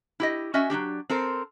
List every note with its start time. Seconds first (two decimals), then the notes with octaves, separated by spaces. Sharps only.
0.20 E4 G4 D#5
0.54 C#4 F#4 D#5 E5 G#5
0.70 F#3 A3 D4 G4
1.09 C4 A4 A#4 C5